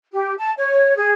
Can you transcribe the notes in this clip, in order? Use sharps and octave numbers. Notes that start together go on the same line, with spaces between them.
G4
A5
C#5
G#4